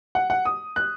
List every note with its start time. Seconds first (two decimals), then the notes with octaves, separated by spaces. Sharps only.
0.15 F#5
0.30 F#5
0.45 D#6
0.76 F#6